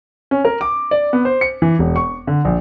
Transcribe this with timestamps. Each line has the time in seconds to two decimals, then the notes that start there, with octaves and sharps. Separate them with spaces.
0.31 C#4
0.45 A#4
0.61 D6
0.91 D5
1.13 B3
1.25 C5
1.41 C#7
1.62 E3
1.79 E1
1.96 C#6
2.27 D3
2.45 A#1